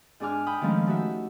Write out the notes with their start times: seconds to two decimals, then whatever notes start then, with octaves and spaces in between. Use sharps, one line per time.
0.20 G#2 D4 G#4 G#5 D6 F6
0.46 G5 B5 D#6
0.61 D#3 F3 G#3 A3 C#4 D#4
0.87 A3 D#4 F#4 G4 E5